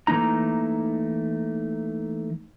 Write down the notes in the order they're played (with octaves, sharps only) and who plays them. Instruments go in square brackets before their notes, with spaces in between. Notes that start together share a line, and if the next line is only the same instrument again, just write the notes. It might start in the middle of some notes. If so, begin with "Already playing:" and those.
[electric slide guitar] E3 A3 A#3 D#4 A#5